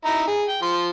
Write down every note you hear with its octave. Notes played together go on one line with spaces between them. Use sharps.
D#4 E4 A#5
G#4
G5
F3 C6